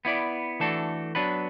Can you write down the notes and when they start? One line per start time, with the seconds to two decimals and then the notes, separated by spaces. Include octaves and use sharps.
0.05 B3 E4 D5
0.60 E3 A3 D4 F#4 A4
1.15 F#3 B3 D4 B4